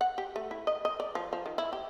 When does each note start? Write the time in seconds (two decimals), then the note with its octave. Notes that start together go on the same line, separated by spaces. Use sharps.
0.01 F#5
0.18 G4
0.36 A3
0.51 E4
0.67 D#5
0.85 D#5
1.00 D5
1.15 F3
1.33 F3
1.46 D#3
1.58 E4
1.73 G4